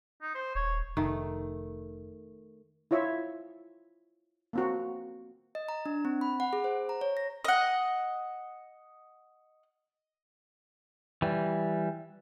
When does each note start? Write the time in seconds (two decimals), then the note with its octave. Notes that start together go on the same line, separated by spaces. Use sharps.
0.22 D#4
0.35 C5
0.55 D#1 C#5
0.97 F1 D#3 A3
2.91 E4 F4 C#5 E5
4.53 A#3 C4 F#4
5.55 D#5
5.69 A#5
5.86 D4
6.05 C4
6.21 B5
6.40 F#5
6.53 G#4
6.64 C5
6.89 A#5
7.01 C#5
7.17 A#6
7.45 D#5 F#5
11.22 E3 G3